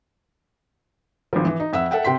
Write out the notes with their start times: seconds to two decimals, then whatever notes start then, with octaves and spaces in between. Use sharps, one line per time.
1.33 G#1 F3
1.45 E3
1.60 D#4
1.73 F2 E5 F#5 E6
1.91 A4 E5 F#5 G5
2.05 C3 G5 C6 B6